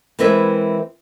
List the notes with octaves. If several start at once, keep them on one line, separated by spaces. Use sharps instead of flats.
E3 G#3 C4 A#4 B4 E5